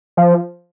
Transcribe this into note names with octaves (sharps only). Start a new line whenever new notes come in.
F3